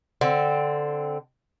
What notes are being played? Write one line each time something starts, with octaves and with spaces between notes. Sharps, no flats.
D3 C4